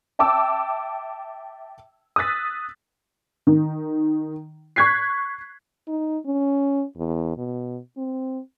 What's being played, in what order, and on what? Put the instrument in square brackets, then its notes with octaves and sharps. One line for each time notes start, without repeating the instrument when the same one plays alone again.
[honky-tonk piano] E5 G5 A5 D6 E6
D#6 E6 F#6 A6 B6
D#3
C#6 F#6 G#6 B6 C7
[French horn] D#4
C#4
E2
B2
C4